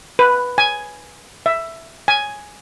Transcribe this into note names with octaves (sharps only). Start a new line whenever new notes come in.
B4
G#5
E5
G#5